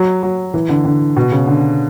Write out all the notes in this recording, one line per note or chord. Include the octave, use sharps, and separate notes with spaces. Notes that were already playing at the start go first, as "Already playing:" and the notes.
Already playing: F#3
F#3
E3
D3
D3
B2
C#3
D3